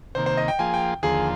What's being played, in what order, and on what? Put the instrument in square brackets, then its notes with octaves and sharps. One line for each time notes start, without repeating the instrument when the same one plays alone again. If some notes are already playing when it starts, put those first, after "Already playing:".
[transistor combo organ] C3 D#3 A#3 [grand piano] C5
[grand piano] C5
D#5
G5
[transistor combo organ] F3 A#3 F4 G#4 [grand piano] G#5
[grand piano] G5
[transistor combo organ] D#2 D3 F3 A#3 F4 [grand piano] G#4